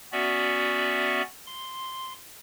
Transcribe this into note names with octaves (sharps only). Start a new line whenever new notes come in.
B3 C#4 F#4 D5 E5
C6